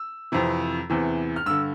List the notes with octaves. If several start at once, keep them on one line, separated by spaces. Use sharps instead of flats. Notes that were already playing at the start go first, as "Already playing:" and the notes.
Already playing: E6
F2 C3 E3
E2 C3 E3
F6
G2 D3 E6